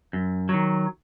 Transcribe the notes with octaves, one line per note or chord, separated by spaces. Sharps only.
F#2
D#3 F#3